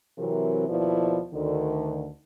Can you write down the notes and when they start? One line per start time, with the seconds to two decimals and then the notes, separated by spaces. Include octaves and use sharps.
0.18 C3 E3 F#3 C4 A#4
0.69 D#2 B2 F3 E4 B4 D5
1.34 D2 D3 D#3